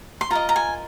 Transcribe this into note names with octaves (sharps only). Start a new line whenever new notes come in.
C6
F4 A#4 D#5 A#5
A#5
G#5